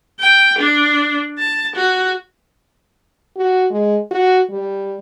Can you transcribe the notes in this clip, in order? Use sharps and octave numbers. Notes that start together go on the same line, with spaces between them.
G5
D4
A5
F#4
F#4
G#3
F#4
G3